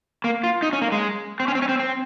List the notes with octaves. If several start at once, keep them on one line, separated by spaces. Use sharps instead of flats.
A#3
F4
D#4
C#4
A#3
G#3
C4
C#4
C4
C#4
C4
C4